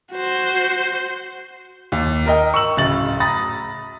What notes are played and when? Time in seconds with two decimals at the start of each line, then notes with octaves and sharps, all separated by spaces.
0.12 F#4 C5
1.92 D#2
2.26 A#4 D#5 G5
2.54 C#6 E6 F#7
2.77 D1 C#3 A6 F#7
3.20 A#5 B5 D#6 A6 A#6